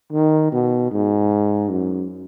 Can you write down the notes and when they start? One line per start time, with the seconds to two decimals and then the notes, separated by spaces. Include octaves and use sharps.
0.12 D#3
0.52 B2
0.91 G#2
1.70 F#2